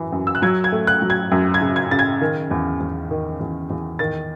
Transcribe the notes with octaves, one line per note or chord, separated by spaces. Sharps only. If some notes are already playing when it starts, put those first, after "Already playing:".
Already playing: F#2 E3
F#2
E6
F#6
F#3 G#6
G#6
A3
F#6
F#3
G#6
F#2
G#6
C#3
G#6
C#3 A6
G#6
D#3
E2
E2
D#3
E2
E2
D#3 A6